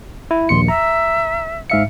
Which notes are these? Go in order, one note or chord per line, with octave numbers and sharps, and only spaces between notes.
E4
A#1 D#2 C6 C#7
E5 A#5
G#2 E5 F5 C#7